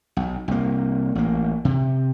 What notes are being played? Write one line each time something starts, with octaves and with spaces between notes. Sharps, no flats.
B1
C2 A#3
A1 A#3
C3